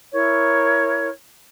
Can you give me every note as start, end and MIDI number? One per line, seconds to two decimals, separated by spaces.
0.12 1.08 64
0.12 1.08 70
0.12 1.08 73